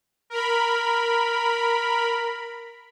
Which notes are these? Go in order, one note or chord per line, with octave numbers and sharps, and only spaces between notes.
A#4 B5